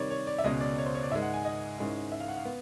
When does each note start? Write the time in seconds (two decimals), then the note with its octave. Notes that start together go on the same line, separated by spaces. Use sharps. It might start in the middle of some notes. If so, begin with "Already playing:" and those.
Already playing: C3 D#3 G3 C#5 D5
0.10 C#5
0.27 D5
0.38 E5
0.44 C#2 B2 G#3 C#4 D#5
0.60 D5
0.78 C#5
0.86 C5
0.94 C#5
1.03 D5
1.11 G#2 D#3 G#3 E5
1.22 F#5
1.34 G#5
1.45 D#5
1.78 G#2 D#3 G#3 C#4 E4
2.12 E5
2.20 F5
2.28 F#5
2.37 F5
2.45 B3